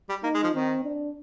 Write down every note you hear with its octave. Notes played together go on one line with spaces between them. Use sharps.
G3
A#3 D#4
G#3
F3
D#3 C4
D4